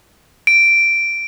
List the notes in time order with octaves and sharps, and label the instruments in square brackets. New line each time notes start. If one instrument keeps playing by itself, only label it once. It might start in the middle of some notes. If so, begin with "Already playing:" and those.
[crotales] D7